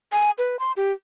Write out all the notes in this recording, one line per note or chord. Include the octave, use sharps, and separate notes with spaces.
G#5
B4
C6
G4